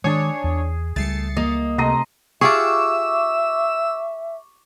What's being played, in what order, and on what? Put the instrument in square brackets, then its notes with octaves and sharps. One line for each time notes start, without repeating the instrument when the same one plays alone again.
[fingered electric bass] D#3 G#3 [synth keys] D4 C#5 [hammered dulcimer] G#4
[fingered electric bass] E2
[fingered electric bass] C#2 G3 [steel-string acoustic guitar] A3 [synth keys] A6 C7 C#7
[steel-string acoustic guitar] A#3 [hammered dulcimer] D#5
[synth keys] C3 A3 [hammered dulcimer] D#5 A#5 C6
[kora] F4 G4 G#4 [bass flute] E5 [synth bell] C#6 D6 [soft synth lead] E6